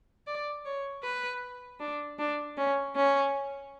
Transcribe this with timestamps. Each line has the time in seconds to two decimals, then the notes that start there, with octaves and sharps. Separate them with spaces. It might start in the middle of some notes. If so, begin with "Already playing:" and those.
0.27 D5
0.65 C#5
1.04 B4
1.80 D4
2.19 D4
2.57 C#4
2.96 C#4